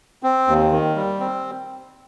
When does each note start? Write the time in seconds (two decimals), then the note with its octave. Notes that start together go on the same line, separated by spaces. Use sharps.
0.23 C4
0.48 D#2
0.71 D#3
0.96 G3
1.20 C4